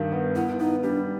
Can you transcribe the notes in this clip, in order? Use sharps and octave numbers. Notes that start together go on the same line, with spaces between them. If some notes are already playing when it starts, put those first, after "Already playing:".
Already playing: G2 D#3 G3
B3
B3 E4
B3 D#4
G3 D4